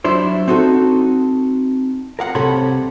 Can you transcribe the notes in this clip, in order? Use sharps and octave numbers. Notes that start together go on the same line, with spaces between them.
F#3 G3 D4 E4 C5
C4 D#4 F#4 A4
A#4 F5 F#5
C2 C3 G4 A4 C#5 B5